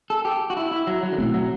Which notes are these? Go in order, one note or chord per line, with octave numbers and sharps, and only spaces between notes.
A4
G4
F#4
E4
E4
F#3
F#3
D3
B2 E3 A3 C4
F#3